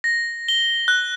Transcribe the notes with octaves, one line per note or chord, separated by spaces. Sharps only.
A#6
G7
F#6